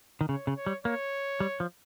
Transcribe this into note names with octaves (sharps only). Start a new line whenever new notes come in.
D#3
C#3 C#5
C#3
C#5
G3
A#3 C#5
G3
F3